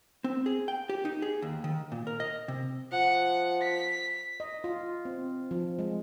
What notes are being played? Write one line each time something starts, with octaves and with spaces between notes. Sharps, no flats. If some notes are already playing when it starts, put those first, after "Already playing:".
C4
G#4
G5
G4
D#4
G#4
D#2
D#3
A#2
A#4
D#5
C3
F3 F#5
B6
D#5
F4
C4
F3
G#3